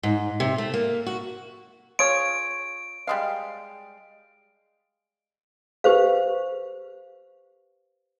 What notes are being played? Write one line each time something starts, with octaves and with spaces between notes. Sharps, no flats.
G#2
C3
A3
A#3
F#4
F4 G#4 C#5 D7
G3 G#3 F5
G4 B4 C5 F5